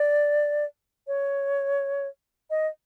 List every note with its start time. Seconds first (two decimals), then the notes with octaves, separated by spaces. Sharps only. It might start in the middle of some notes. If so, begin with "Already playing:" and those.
Already playing: D5
1.07 C#5
2.50 D#5